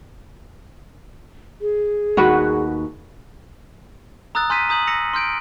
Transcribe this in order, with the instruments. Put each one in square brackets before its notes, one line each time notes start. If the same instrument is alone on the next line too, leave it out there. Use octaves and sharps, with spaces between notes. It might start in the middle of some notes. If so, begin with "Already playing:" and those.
[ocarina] G#4
[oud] D#2 F#4 B4
[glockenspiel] A#5 D#6 E6 F#6 A6
G#5 C6 F6 G6 B6 D#7
A#5 D#6 G6 F#7
E6 A#6 C#7 F7
C6 F6 G6 D7